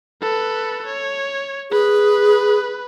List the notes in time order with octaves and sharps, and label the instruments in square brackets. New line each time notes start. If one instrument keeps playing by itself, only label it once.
[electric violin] A4 B4
C#5
[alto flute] G#4 [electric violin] B4